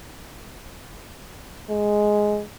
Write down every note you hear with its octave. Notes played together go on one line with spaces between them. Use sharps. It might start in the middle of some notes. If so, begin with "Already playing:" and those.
G#3